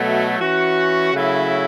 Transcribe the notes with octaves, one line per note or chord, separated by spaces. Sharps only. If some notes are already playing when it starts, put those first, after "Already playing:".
Already playing: B2 F#3 A3
E3 C#4 F#4
C#3 F#3 A3 E4